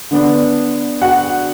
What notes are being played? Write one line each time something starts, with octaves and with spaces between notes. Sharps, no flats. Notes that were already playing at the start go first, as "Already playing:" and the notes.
D3 B3 D4
F#4 F#5